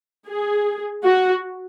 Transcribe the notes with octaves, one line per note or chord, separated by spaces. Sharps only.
G#4
F#4